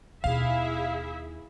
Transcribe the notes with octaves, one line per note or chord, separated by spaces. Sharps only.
D#2 B2 E4 G#4 E5 F5